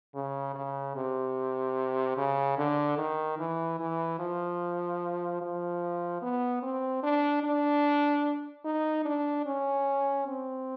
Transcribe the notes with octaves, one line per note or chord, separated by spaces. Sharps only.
C#3
C#3
C3
C#3
D3
D#3
E3
E3
F3
F3
B3
C4
D4
D4
D#4
D4
C#4
C4